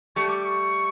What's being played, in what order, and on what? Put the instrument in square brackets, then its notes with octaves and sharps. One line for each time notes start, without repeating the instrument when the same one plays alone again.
[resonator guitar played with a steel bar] G3 A3 [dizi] C#6
[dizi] D6
D6
C#6